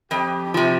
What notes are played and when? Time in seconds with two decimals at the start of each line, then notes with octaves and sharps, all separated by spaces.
0.11 F2 G4
0.54 C3 F3